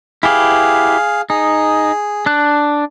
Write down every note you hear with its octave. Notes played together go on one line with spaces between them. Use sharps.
E4 G4 G#4 B4 F5
D#4 G#4
D4 F#6